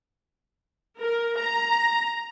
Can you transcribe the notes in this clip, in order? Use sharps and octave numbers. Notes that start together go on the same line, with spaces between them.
A#4
A#5